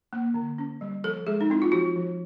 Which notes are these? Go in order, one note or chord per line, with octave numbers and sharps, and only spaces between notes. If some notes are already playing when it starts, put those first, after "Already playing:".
A#3
D3
C#4
G3
F3 A4
G#3 G#4
D#4
C4 E4
F4
F3 F#4
F3